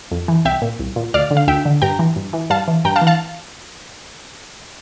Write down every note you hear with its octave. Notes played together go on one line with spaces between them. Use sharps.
F2
E3
C2 E5 G5
A#2
C2
A#2
D2 D5 F5
D3
F5
D2 E5 G5
D3
G2 G5 A#5
E3
G2
E3
G2 F5 A5
E3
G2 G5 A#5
F5 A5
E3
F5 A5